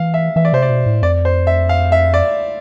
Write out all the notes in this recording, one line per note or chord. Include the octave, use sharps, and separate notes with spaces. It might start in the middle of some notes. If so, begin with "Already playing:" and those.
Already playing: E3 F5
E5
E3 E5
D5
C3 C5
D5
B2
A2
F2 D5
C5
E5
F5
E5
D5